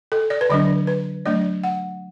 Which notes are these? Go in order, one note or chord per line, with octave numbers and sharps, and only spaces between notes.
A4
D5
B4
D3 F#3 D4 D5
B4
F#3 A3 D4 D5
F#5